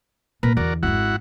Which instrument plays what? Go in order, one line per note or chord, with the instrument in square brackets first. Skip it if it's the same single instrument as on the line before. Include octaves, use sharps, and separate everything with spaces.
[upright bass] A#2 [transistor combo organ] A#4 B4
[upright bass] E2 D3 [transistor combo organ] F#4 A#4 D5
[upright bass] G#1 F2 [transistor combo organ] E4 F#4 F#5